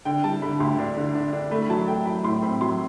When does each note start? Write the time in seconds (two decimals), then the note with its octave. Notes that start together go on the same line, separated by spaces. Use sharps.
0.05 D3 G5
0.24 G3 A5
0.42 D3 B5
0.60 D2 C6
0.79 D4
0.97 D3
1.15 D4
1.33 D4
1.51 A3 B5
1.62 B5
1.70 F#3 A5
1.88 A3 G5
2.06 F#3 B5
2.24 A2 C6
2.43 C4 B5
2.61 F#3 C6